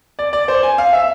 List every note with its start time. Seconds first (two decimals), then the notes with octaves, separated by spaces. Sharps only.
0.19 D5
0.33 D5
0.48 C5
0.63 G#5
0.78 F5
0.93 E5